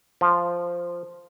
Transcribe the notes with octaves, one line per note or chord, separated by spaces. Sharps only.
F3